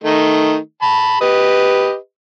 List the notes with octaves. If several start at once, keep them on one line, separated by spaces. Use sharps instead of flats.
D#3 A3 D#4
A5 B5
G4 B4 D#5